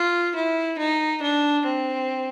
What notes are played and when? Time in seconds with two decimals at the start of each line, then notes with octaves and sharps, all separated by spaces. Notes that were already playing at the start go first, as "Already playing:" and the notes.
Already playing: F4
0.35 E4
0.78 D#4
1.22 D4
1.65 C4